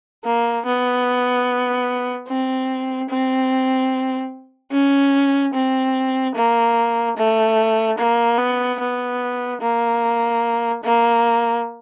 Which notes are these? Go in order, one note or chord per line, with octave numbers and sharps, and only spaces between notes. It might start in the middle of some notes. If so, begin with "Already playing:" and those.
A#3
B3
C4
C4
C#4
C4
A#3
A3
A#3
B3
B3
A#3
A#3